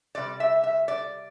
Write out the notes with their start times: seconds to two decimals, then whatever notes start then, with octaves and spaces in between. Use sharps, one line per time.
0.15 C3 G3 D5
0.40 E5
0.63 E5
0.88 D5